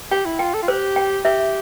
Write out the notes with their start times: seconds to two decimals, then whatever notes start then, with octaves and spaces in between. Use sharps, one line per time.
0.11 G4 G5
0.25 E4
0.39 F4 G5
0.54 A4
0.63 F4
0.68 G4 C5
0.96 G5
1.25 G4 E5